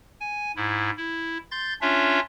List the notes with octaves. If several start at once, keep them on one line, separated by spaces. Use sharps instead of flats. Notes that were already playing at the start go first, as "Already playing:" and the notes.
G#5
G#2 E4
E4
C6 G6 A6
C#4 D4 F4 C#5 E5